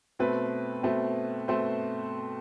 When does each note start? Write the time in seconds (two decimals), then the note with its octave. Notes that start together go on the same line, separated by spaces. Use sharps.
0.19 B2 A3 C4 B4
0.83 B2 A3 C4
1.48 B2 A3 C4 C5